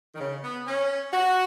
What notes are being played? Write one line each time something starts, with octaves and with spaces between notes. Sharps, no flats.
D#3
C#3
B3
C#4
F#4